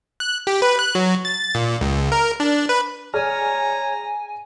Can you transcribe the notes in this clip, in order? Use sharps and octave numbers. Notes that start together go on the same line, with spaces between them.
F#6
G4
B4
F#6
F#3
A6
A#2
C#2
A#4
D4
B4
G#4 C#5 D5 G#5 A#5 F6